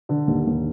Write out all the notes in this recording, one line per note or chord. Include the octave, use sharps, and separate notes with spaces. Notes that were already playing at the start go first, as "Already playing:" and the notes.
D3
D#2
D#2